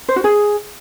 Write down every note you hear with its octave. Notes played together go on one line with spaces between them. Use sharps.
C5
F#4
G#4